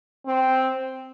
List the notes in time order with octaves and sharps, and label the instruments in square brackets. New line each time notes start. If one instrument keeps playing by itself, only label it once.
[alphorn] C4